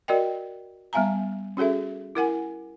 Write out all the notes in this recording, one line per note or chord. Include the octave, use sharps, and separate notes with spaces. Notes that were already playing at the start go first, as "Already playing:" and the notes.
F#4 A#4 D5 D#5 G5
G3 B3 E5 F5 G#5 A#5
C#4 F#4 G#4 A4 E5
E4 A#4 F#5 G#5